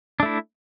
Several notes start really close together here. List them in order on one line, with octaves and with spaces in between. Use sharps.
D4 A3 E4